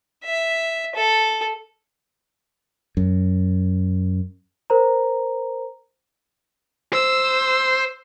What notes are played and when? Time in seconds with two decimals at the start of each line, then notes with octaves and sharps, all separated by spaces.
0.24 E5
0.96 A4
2.97 F#2
4.70 A#4 C5 A#5
6.93 C5 E6